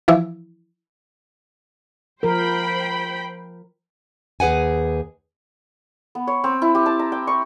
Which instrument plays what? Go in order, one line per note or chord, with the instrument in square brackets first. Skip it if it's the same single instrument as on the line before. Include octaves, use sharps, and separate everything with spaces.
[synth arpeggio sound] E3 F3 E4
[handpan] F3 A#4 [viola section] C5 G5 B5
[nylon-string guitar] D#2 G#4 B4 F#5 G#5
[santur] B3
C#5
C4
E4
G4
A5
A#5
G5
C#6